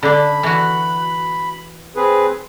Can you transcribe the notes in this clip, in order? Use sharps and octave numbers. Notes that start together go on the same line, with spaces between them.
D3 D4 B5
E3 F#4
C4 G#4 B4